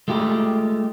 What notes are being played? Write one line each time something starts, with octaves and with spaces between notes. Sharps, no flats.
G#3 A3 F4 G4